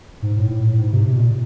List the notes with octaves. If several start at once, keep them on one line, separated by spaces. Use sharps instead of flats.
G#2
A2
A2
A2
G#2
C3
C3
B2
A#2